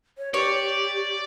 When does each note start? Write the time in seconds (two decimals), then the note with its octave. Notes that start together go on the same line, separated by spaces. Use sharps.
0.18 C#5
0.34 G4 C#5 D5